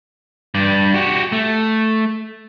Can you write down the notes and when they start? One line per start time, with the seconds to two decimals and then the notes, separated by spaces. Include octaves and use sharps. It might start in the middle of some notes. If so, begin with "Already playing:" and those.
0.55 G2 D5
0.94 F#4 G4
1.32 A3